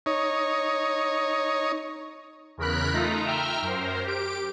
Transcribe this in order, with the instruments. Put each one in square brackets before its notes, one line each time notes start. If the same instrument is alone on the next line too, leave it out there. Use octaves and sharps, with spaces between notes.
[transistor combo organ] D#4 C#5
[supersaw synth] E2 C#3 A#4 B5 F#6
A3 D#4 F4 A#5
E5 G5 A#5 F6
F#2 A#4 C5
G4 D7